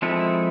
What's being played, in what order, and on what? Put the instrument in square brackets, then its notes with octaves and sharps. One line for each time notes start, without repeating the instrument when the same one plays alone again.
[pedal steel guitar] F3 G#3 C4 E4 A4